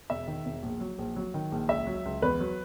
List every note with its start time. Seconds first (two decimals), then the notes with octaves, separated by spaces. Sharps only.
0.10 E1 E5
0.27 D#3
0.45 E1
0.62 A#1
0.81 F#3
0.98 A#1
1.16 F#3
1.34 D#3
1.52 A#1
1.69 C#2 E5
1.87 F#3
2.05 C#2
2.22 E2 B4
2.41 F#3